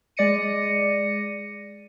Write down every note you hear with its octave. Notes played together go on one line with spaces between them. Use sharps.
G#3 D5 A#6 C#7 D#7